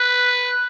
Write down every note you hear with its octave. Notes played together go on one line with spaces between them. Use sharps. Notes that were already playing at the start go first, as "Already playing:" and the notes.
Already playing: B4